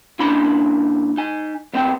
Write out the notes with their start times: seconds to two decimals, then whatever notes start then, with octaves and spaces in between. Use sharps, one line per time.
0.19 A#2 C#4 D4 E4 B5 C6
1.17 D#4 G#5
1.73 B1 B3 C4 F#5 G5